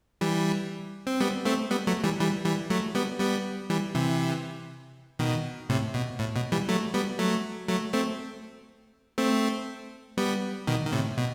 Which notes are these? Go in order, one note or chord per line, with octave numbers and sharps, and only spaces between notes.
E3 G3
C4
G3 B3
A3 C4
G3 B3
F#3 A3
E3 G3
E3 G3
E3 G3
F#3 A3
G3 B3
G3 B3
E3 G3
C3 E3
B2 D#3
A2 C3
B2
A2
B2
E3 G3
F#3 A3
G3 B3
F#3 A3
F#3 A3
A3 C4
A3 C4
G3 B3
B2 D#3
D#3
A2 C3
B2